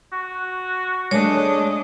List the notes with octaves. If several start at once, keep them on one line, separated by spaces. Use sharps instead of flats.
F#4
G#3 A3 D4 C#5 D#5